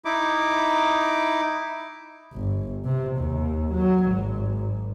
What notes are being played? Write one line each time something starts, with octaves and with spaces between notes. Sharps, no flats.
D#4 E4 D6
G1
C3
D#2
F#3
G#1